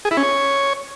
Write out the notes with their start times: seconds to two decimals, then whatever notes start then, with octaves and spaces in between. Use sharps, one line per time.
0.05 G#4
0.11 E4
0.17 C#4
0.23 C#5